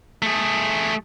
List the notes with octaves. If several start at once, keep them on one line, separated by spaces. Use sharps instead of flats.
A3 G#4